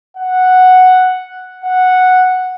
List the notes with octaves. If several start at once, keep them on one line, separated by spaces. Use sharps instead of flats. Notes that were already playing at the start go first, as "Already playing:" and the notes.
F#5
F#5